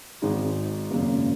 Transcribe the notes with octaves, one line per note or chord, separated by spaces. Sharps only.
G#1 G#2 G#3
G#1 F#2 C#3 A#3